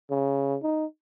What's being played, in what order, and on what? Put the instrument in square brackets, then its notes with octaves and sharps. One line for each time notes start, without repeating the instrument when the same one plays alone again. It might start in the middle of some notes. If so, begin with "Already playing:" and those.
[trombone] C#3
D#4